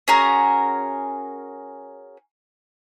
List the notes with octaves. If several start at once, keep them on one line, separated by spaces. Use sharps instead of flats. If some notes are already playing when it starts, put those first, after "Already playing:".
C#4 F#4 G#4 A#4